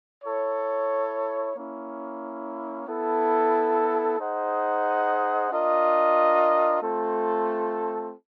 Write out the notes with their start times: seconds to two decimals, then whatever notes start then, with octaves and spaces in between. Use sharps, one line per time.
0.24 E4 A4 C#5
1.55 A#3 C#4 E4
2.87 B3 E4 A4
4.19 D#4 G#4 C5 D#5 F#5
5.50 D4 F4 A#4 D#5
6.81 A3 C4 F4 A4